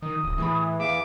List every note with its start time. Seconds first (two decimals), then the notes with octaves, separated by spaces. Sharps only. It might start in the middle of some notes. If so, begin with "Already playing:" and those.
0.02 D#3 D#6
0.24 D1
0.38 A2 E3 G#4 B5
0.80 E2 G#4 E5 F5 D6